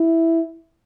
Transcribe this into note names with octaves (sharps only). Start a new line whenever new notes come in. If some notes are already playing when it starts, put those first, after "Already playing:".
Already playing: E4